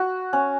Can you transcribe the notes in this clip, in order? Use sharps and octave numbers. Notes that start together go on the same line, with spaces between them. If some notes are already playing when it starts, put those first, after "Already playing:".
Already playing: F#4
C#4